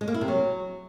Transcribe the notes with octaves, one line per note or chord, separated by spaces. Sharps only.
G#3
A#3
E4
C3
F#3